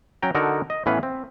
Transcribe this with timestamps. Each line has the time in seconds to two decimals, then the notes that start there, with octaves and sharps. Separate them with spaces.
0.22 F#3 C#4 G5 A#5
0.35 D3 D#4 F#4 A4 A#4
0.70 D#5
0.86 A2 E3 B3 C#4 B4 F5
1.03 C4